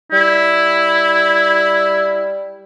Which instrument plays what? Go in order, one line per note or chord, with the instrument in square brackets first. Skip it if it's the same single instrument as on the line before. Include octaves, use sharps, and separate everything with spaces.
[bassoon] G3 [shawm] E4